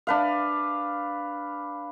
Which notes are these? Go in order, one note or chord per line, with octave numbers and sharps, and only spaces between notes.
D4 B4 F5